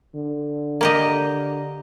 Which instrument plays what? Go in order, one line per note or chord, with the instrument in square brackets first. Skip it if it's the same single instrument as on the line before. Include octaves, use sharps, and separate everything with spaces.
[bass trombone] D3
[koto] A#3 G4 D#5